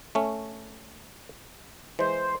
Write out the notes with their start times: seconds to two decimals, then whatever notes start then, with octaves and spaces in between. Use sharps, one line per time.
0.15 A3 C#4
1.99 E3 G#3 C5